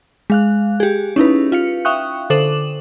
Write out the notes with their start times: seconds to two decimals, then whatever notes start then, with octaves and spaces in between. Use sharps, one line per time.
0.30 G#3 F5 F#6
0.80 G4 G#4
1.16 C#4 D#4 E4 B4
1.52 F4 F5 C#7
1.85 E5 F5 G5 C#6 D#6 F#6
2.30 D3 A4 C5 D6 E7 F#7